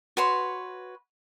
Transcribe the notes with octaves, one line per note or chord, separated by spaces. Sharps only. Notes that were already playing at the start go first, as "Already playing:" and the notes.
F#4 B4 C#5 C6